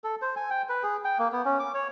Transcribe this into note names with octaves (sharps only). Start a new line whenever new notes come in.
A4
C5
G#5
G5
B4
G#4
G5
A#3
B3
C#4
D6
C#5